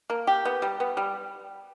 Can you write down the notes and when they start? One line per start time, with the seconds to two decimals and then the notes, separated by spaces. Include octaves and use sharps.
0.10 A#3
0.27 G4
0.45 B3
0.62 G3
0.80 B3
0.97 G3